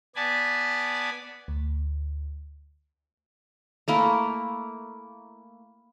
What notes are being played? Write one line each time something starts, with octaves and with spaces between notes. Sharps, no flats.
B3 D5 G#5 A5 B5
D2
A3 A#3 E4